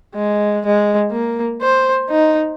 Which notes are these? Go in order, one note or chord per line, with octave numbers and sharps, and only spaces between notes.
G#3
G#3
A#3
C5
D#4